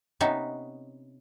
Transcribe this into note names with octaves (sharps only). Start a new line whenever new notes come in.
C3 B3 C#4 D#4 E5